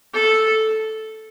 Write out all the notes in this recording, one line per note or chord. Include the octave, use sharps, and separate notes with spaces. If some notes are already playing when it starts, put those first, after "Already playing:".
A4